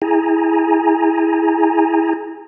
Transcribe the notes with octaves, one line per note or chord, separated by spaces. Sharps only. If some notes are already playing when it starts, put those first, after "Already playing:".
E4 G#4 G#5 A#5